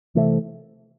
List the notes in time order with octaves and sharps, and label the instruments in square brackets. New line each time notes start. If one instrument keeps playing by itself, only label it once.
[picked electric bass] C3 E3 A3